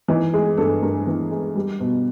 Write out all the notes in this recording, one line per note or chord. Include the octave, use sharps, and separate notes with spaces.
E3 D#4
G#3 G#4
G2 A4
G2 A#4
E3
G#3
G3
B2